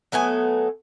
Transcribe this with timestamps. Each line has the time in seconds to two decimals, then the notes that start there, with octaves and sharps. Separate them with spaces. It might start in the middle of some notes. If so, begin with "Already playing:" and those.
0.12 F#3 A3 B3 G#5